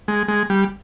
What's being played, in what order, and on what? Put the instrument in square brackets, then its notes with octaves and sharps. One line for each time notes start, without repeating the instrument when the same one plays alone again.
[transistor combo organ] G#3
G#3
G3